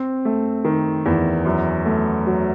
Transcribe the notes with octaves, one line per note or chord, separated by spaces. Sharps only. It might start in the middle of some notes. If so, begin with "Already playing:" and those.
Already playing: C4
A3
D#3
E2
F#2
A3
F#3